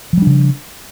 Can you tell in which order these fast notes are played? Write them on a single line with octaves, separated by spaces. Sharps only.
F3 G3 D4 C#3